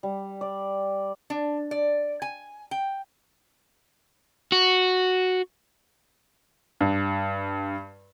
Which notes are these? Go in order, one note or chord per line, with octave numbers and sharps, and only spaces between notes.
G3
D5
D4
D5
G#5
G5
F#4
G2